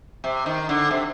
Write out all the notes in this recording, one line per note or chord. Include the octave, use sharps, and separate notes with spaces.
C3
D#3
D3
C3